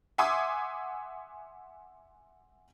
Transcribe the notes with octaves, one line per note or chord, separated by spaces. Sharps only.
E5 F#5 G#5 C6 D6 D#6